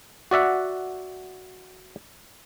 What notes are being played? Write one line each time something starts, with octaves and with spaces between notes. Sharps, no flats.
F#4 D5 E5 F#5